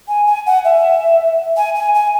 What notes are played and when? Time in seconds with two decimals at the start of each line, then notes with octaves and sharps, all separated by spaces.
0.08 G#5
0.27 G#5
0.46 F#5
0.65 E5
1.57 G#5
1.75 G#5
1.95 G#5